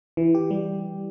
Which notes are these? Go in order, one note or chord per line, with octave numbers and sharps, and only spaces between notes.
E3
G4
G3